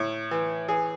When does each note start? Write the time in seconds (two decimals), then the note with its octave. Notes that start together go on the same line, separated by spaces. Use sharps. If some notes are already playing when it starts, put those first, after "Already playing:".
Already playing: A2
0.31 E3
0.68 E3 G#4